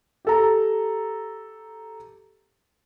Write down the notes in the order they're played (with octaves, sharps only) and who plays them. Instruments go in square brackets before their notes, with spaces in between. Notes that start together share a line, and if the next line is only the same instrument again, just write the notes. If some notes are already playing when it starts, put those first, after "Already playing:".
[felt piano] G4 A4 A#5